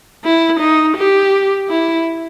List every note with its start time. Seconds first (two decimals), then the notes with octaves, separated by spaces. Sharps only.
0.25 E4
0.60 D#4
0.97 G4
1.69 E4